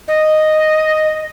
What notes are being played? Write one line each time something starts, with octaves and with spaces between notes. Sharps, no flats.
D#5